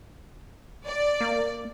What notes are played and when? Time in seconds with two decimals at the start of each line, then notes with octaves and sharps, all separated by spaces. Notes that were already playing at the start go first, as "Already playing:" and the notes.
0.85 D5
1.21 A#3